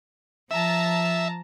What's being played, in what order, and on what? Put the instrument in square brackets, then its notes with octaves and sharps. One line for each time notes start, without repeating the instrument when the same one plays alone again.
[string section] F3 A5 A#5 [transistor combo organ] E5